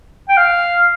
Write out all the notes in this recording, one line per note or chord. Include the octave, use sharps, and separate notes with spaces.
G5
F5